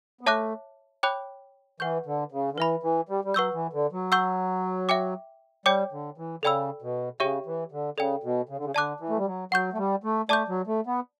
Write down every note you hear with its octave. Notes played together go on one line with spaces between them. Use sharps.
B3
A3 C#5 E5 A5 D6 F#6
C#5 G5 B5 D6 F#6
E3 B4 F#5 C#6 G6
D3
C#3
D3
E3 B4 E5 B5
E3
G3
G3
F#3 B4 F#5 C#6 E6 G6
E3
D3
F#3
F#5 C#6 E6 G6
E5 G5 D6
G3 C#5 G5 D6 G6
D3
E3
C#3 A4 D5 G5 B5 E6
B2
C#3 G4 C#5 E5 G5 C#6
E3
D3
C#3 A4 D5 G5
B2
C#3
D3
C#3
D3 D5 A5 D6 F#6
E3
A3
G3
F#3
F#3 F#5 C#6 G6
A3
G3
A3
A3 D5 A5 D6 G6
F#3
A3
B3